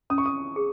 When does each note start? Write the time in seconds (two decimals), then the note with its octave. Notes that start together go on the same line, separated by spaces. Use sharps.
0.10 C#4 D#6
0.18 C#6
0.26 D#6
0.56 G#4